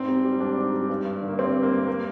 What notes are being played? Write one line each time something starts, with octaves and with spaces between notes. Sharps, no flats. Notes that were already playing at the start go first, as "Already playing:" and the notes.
Already playing: G#2 C4
G3
G3
G#2 D4
G#2
G3
G2
G2
D3
A#3
G3 C4
G2
A#3
G2
A#3